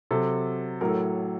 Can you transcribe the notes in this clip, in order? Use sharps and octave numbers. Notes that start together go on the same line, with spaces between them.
C3 F#3 A4
A2 F#3 A#4
A4